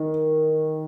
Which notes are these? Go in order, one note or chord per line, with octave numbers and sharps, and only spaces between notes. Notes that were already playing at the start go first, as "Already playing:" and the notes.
Already playing: D#3